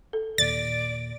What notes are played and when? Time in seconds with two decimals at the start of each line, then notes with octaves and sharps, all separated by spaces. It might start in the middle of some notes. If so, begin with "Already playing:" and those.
0.13 A4
0.38 D#2 A#2 D5 A6